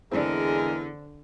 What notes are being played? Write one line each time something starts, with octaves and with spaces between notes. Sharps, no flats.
E2 D3 G#3 C4 D4 G#4 A#4